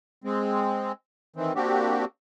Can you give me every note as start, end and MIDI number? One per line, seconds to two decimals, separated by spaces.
0.24 0.92 56
0.24 0.92 60
1.36 1.53 51
1.36 1.53 52
1.36 1.53 60
1.55 2.05 58
1.55 2.05 60
1.55 2.05 62
1.55 2.05 66
1.55 2.05 67